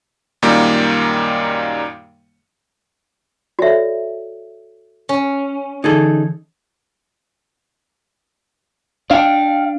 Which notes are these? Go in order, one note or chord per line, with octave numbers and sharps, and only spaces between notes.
F#2 A#2 D#3 G3 A#3
F#4 A4 C#5 D5 E5
C#4
D3 E3 D#4 G#4 A4
D4 F5 G5